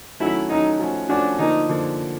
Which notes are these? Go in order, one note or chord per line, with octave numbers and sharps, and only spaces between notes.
D#3 F#3 A3 C#4 E4 F#4
D#3 F#3 A3 C#4 D#4 F#4
F3 A3 C#4 F#4
F3 A3 C#4 D4 F#4
D3 F3 A#3 D#4
D3 F3 A#3